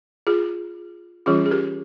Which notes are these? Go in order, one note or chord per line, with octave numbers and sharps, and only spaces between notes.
F4 G#4
E3 G3 C#4 F4 G#4
G#4
G4 A#4